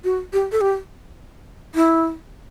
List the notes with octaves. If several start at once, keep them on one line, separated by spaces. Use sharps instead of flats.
F#4
G4
A4
G4
E4